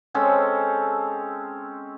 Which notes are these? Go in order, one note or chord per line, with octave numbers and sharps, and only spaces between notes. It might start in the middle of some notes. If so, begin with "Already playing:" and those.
G#3 C4 C#4 A4